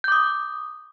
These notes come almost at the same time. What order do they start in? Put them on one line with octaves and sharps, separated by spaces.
G6 D6 D#6